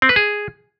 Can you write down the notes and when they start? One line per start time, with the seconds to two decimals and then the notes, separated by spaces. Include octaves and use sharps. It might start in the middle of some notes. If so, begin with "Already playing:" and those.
0.02 C4
0.09 B4
0.16 G#4